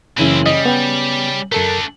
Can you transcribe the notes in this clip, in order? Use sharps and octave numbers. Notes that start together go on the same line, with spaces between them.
F#1 C#3 E3 C4 E4 D#7
G3 D#5
B3 G5 F7
F#2 A3 D4 A4 A#4